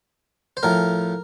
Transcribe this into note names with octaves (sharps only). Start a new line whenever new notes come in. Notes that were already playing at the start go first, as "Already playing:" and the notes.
C5
A2 F3 A#4